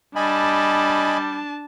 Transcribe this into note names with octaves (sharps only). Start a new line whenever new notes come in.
G3 D4 D#5 G#5 A5 B5